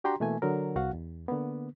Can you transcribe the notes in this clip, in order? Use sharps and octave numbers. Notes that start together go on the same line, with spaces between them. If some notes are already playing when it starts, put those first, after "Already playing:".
D4 F#4 G4 G5 A#5 C6
B2 E3 A3 A#3 G#5
D3 F#3 A#4
C2 F#4 F5 F#5
E2
D3 A#3 B3